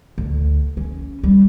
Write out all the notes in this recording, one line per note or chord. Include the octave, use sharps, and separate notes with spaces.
D2
C#4
G3